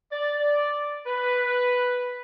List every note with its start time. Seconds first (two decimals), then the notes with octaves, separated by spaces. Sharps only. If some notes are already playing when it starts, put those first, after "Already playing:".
0.12 D5
1.06 B4